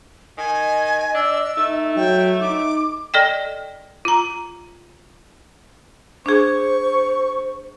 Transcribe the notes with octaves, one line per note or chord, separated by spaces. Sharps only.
D#3 D#5 G#5
D4 E6
A3 D#4
F#3 G5
D#4 D6
A4 D5 D#5 G5
F4 A#5
D4 G#4 C5 C#6